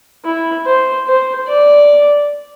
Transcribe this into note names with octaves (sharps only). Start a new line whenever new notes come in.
E4
C5
C5
D5